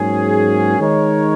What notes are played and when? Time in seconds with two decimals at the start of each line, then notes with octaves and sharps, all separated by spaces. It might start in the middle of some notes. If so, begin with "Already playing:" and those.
Already playing: G#2 F#3 A#3 C#4 G#4
0.79 D#3 G#3 D#4 A#4 C#5